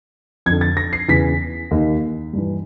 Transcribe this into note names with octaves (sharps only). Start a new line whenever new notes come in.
F2 D3 G#6
A6
A#6
C7
E2 C#3 E3 B6
D#2 D#3
G2 E3